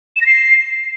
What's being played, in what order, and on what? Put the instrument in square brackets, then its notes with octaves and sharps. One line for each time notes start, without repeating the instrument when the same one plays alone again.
[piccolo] E7
A#6
C7